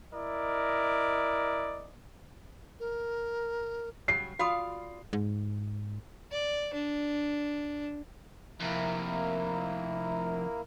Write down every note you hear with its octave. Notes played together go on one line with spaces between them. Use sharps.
E4 A#4 D5 D#5
A#4
C#3 F#3 G3 C7
F4 F#4 D5 F5 B5 D#6
G#2
D5
D4
F2 C3 A#3 E4 A#4